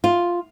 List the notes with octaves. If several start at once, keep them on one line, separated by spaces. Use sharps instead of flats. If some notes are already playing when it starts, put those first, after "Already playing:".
F4